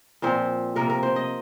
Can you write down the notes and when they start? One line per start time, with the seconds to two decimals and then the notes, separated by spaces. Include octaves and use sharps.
0.22 A#2 F3 C4 C5
0.76 C3 F3 A#3 A#4
0.90 A#4
1.03 C5
1.16 D#5